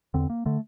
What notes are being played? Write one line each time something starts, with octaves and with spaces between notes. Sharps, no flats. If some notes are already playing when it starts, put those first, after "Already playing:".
E2 D3 C4
A#3
D3 A3